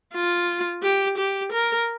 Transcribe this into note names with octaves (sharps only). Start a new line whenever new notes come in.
F4
G4
G4
A#4